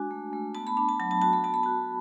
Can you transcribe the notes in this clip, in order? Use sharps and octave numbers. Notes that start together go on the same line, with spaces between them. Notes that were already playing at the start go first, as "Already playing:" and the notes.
Already playing: G#3 D4 F#4 G#5
A3
A3
B3 A5
B5
D4 B5
A5
F#3 A5
A5
F#4 A5
B5
B3 A5
B5
F#4 A5